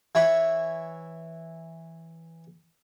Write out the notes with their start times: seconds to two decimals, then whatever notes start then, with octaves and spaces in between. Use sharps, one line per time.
0.15 E3 E4 C#5